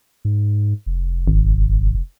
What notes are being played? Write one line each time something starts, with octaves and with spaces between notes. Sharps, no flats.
G#2
F1
G#1